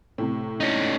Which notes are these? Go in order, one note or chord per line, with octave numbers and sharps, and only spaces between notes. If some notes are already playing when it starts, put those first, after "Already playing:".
A2 C3
C#4 D#4